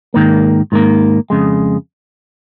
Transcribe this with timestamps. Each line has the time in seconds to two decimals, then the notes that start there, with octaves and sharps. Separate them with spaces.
0.14 G#2 D#3 A#3
0.72 G#2 D#3 A#3
1.30 F2 C#3 G#3